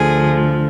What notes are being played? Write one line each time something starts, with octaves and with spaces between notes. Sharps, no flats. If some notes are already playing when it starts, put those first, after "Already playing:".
Already playing: D2 D3 F3 G#4